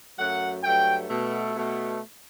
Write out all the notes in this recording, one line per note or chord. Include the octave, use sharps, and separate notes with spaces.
F#2 F#3 A3 F#5
G2 F#3 A3 G5
B2 A3
B2 A3